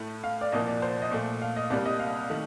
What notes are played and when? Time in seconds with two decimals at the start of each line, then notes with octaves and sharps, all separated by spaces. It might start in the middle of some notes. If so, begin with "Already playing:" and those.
Already playing: A2 A3
0.24 F5
0.41 D5
0.52 C2 A#2 F3 A#3 D#5
0.67 D5
0.82 C5
1.02 D#5
1.11 A#2 A3
1.42 F5
1.56 D#5
1.70 C2 C3 G3 A#3 D5
1.85 D#5
2.00 F5
2.30 D#3 A3